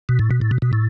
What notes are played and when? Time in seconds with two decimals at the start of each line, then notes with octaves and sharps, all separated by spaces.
0.09 B2
0.19 A2
0.31 B2
0.41 A2
0.51 B2
0.62 B2
0.73 A2